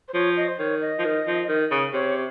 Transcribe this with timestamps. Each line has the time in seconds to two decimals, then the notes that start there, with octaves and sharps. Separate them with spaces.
0.08 C5
0.14 F3 C#5
0.37 D#5
0.48 C5
0.59 D#3 C#5
0.81 D#5
0.99 F3
1.04 D#3
1.27 F3
1.49 D#3
1.71 C#3
1.94 C3 C#5